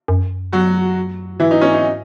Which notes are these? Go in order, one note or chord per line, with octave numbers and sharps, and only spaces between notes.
F#2
F#3 F#4
G#2 E3 E4
D#4
C#4
D#4